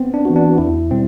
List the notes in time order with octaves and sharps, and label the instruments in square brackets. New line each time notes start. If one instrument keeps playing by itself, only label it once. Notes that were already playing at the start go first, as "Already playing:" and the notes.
Already playing: [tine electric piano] B3 C4
D4
[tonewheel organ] E3 B3 F#4
[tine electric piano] D4
[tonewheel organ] E2 [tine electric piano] E4
[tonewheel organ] B2 G3 [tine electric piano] C4